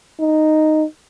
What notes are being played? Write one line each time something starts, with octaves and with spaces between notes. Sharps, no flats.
D#4